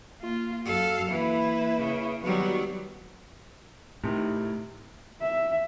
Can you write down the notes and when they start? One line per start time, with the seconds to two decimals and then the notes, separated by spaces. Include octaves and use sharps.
0.20 A#3 F4
0.65 F#2 F#4 A4 F5
1.11 E3 A#3 E4 B4 E5
1.77 C#3
2.23 D#3 F#3 G3 B3 F#4
4.04 A2 C3 D#3
5.22 E5